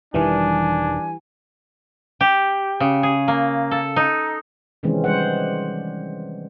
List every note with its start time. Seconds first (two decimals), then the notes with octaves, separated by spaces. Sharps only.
0.14 E1 D#3 E3 G3 D4 G#5
2.21 G4
2.80 C#3
3.03 G#4
3.28 A#3
3.71 A4
3.96 D#4
4.83 C3 D#3 E3 G#3 C4 C#4
5.04 G3 C5 F#5